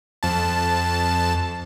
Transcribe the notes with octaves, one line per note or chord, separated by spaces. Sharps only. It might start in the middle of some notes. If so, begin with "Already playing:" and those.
F2 A5